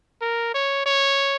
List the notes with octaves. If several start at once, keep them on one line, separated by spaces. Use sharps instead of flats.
A#4
C#5
C#5